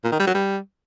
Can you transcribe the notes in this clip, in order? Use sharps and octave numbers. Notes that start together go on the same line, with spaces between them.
A#2
D#3
G3
F#3
G3